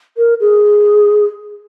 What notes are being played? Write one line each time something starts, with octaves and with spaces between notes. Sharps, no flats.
A#4
G#4